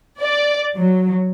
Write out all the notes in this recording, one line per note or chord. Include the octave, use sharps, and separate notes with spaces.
D5
F#3